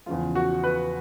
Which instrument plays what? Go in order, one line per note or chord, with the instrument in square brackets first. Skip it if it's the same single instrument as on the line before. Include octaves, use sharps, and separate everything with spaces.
[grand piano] E2 C#3 F3 F4
F#4
B4